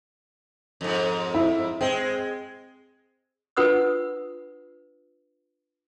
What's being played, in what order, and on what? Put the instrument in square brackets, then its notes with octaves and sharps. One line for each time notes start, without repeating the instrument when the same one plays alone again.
[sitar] F2 G#2
[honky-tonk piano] E4
[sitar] G#3 [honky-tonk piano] C4
[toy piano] D4 F4 B4 F#5 D#6 E6